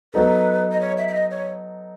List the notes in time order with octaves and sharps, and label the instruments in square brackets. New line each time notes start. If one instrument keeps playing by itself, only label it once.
[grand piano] F#3 B3 D#4 A4 [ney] B4
[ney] D#5
C#5
E5
E5
D#5
C#5